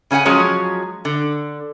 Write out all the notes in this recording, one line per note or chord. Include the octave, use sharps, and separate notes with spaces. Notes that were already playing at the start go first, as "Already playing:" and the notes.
C#3 C#4 F4 F#5 G#5
F3 F#3 G#3 C#4 C#5
D3